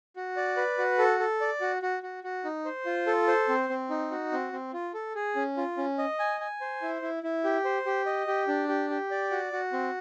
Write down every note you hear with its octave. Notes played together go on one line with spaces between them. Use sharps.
F#4
D5
B4
F#4
A4
A4
D5
F#4
F#4
F#4
F#4
D#4
C5
F4
A4
C5
C4
C4
D#4
F#4
C4
C4
F4
A4
G#4
C#4
F4
C#4
D#5
G#5
G#5
C5
E4
E4
E4
G4
C5
G4
D#5
G4
D4
G4
G4
D5
F#4
F#4
C4